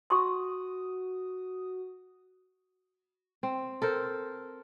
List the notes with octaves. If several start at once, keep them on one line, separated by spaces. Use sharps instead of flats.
F#4 C6 C#6 D#6
C4
A4 A#4 C5